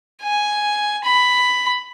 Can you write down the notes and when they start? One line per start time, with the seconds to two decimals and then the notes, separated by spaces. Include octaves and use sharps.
0.22 G#5
1.04 B5